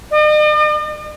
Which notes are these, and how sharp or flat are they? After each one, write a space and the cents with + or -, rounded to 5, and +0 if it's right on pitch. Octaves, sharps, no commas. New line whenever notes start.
D#5 -45